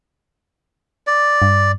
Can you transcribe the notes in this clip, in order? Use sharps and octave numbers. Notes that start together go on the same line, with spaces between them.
D5
G2